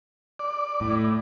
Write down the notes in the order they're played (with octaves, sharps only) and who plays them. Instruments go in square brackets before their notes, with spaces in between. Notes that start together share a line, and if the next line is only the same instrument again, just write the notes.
[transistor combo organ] D5
[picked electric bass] A2